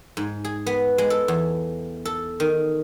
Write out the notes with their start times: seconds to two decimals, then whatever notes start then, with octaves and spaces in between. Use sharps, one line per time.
0.17 G#2
0.44 G#4
0.66 B3
0.98 G#3
1.10 A4
1.28 E2
2.05 A4
2.40 D#3